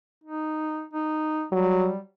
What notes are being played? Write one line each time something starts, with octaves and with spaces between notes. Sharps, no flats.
D#4
D#4
F#3 G3